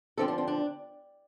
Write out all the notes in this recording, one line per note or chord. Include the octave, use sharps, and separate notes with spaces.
D3 F3 C4 A4
D4
C4
D4